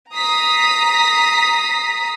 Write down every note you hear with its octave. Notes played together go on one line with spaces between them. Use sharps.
A#5 D#6 B6 C7